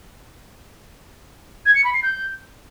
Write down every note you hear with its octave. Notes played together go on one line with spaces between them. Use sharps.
G#6
C#7
B5
C7
G6